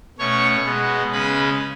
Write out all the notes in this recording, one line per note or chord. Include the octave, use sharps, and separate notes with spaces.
B2 A3 C#4 C#5 C#6
B2 G#3 B3
C#3 G#3 C#4 B4 B5